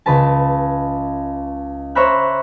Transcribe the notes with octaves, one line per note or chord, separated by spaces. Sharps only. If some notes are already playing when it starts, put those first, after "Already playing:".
C#2 B4 A5
C5 C#5 E5 A#5 B5 F#6